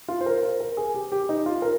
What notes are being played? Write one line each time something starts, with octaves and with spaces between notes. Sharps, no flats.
F4
C5
A#4
C5
A#4
G#4
G4
G4
D#4
F4
A#4